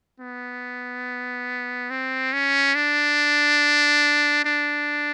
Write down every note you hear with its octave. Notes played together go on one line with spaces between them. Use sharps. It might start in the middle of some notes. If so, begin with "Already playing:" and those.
B3
C4
C#4
D4
D4